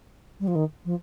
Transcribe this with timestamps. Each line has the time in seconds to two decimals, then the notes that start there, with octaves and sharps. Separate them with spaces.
0.40 G3
0.47 F3
0.55 D#3
0.85 F3